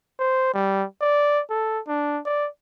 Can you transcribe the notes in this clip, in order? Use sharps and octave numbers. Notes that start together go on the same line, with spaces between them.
C5
G3
D5
A4
D4
D5